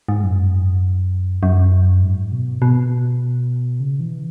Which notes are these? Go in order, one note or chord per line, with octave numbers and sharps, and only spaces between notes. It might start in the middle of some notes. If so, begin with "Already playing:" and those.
G#2
F#2
F#2
G#2
B2
B2
C#3
E3